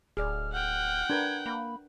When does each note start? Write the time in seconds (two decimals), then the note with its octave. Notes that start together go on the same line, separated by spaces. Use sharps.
0.17 D1 G#4 D5 F6
0.53 F#5 G5 F6
1.10 D4 A#4 B4 G#6
1.46 A#3 B5